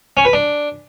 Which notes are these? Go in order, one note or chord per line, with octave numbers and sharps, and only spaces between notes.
C#4
B4
D4